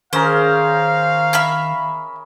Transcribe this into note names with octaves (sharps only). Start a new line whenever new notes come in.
D#3 C#4 G#4 A#4 C5 F5
E5 B5 F6